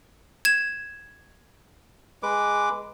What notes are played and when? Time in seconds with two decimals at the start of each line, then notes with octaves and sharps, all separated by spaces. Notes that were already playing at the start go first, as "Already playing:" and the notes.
0.45 G#6 E7
2.23 G#3 B4 D6